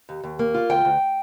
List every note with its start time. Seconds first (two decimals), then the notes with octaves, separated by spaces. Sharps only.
0.09 D#2
0.24 D#2
0.39 A#3
0.54 F4
0.69 D2 G5
0.85 D2